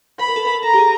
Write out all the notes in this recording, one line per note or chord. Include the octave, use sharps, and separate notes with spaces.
B4 B5
A#4
A4
A#4
A4 A#5
G4
G#4